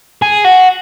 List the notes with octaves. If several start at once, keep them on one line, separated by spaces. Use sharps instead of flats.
G#4
F#4